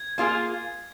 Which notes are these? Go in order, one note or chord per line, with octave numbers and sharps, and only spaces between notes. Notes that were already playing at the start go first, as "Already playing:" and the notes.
Already playing: G#6
A#3 F4 G#4